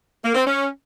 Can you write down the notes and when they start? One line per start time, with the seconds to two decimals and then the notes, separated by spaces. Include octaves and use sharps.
0.23 A#3
0.35 C4
0.46 C#4